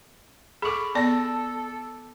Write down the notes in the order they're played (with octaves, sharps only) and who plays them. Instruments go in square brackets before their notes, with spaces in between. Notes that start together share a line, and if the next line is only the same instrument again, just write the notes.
[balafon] G#4 A4 [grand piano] B5 C#6 D6
[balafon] B3 D5 [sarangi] A4 [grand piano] A5 A#6